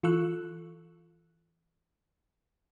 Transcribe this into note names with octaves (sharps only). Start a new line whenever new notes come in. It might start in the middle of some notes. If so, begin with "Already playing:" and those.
E3 F4 A4 C#6 E6 F#6